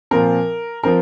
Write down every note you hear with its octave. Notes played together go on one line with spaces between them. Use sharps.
A#2 F3 C4 A#4
F3 C4 A#4